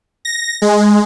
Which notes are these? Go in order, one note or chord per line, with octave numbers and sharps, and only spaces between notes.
A#6
G#3